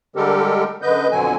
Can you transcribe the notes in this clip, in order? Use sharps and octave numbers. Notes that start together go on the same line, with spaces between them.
D3 G3 G#3 G4 A4 A#4
F#2 D3 B4 D#5 G6
F2 B2 D3 F#3 C4 G#5